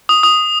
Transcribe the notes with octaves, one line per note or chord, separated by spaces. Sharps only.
D#6
D#6